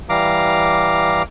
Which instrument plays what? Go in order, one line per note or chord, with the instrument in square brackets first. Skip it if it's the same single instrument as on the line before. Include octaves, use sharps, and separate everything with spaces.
[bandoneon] E3 G3 F5 A#5 D6